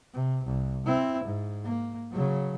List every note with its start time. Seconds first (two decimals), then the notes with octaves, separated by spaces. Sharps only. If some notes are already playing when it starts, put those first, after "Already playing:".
0.14 C3
0.45 C2
0.86 C4 E4
1.24 G#2
1.64 A#3
2.11 C#3 F#3